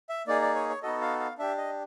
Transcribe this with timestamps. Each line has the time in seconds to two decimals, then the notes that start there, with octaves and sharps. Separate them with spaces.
0.09 E5
0.27 A#3 D#4 G#4 D5
0.42 D5
0.55 C#5
0.69 C#5
0.83 B3 D#4 F#4 A4 D#5
1.01 F5
1.20 F5
1.38 D4 G4 E5
1.57 D#5